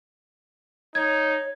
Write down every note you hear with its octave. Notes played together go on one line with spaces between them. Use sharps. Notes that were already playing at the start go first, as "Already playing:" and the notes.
D#4 C#5 G#6